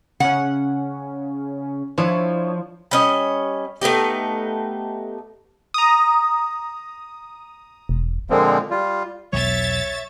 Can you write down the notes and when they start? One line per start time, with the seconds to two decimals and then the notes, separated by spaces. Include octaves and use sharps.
0.20 C#3 C#4 F#5
1.98 F3 D4 E4 C#5
2.91 G3 C#4 D#5
3.81 A3 B3 D#4 G4
5.74 A#5 D#6
7.89 E1
8.30 A#2 D3 F3 G#3 A#3 C4
8.70 G3 F4
9.33 E1 B1 F#3 C#5 E5 A6